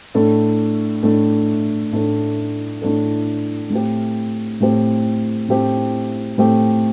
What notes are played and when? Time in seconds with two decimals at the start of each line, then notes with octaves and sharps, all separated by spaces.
0.15 A2 A3 D4 A4
1.03 A2 A3 D4 A4
1.93 A2 A3 D4 A4
2.82 A2 A3 D4 A4
3.70 A2 A3 C4 G4
4.60 A2 A3 C4 G4
5.49 A2 A3 C4 G4
6.38 A2 A3 C4 G4